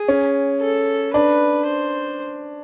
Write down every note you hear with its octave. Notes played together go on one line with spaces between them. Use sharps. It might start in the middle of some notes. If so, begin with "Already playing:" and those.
Already playing: G#4
C#4
A4
D4 B4
C5